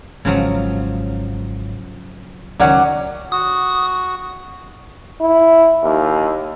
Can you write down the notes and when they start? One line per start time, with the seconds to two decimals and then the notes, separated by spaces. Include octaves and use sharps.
0.25 G#1 G#2 C#3 F3 F#3
2.60 C#2 D#3 F#3 C#4 D5 F#5
3.32 F#4 D#6
5.21 E4
5.83 D#2